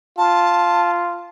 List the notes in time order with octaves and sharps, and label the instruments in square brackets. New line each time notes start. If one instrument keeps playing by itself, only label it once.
[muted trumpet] F4 [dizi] A5